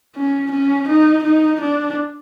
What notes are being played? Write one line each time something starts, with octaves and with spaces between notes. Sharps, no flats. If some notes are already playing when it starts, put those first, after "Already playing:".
C#4
C#4
D#4
D#4
D4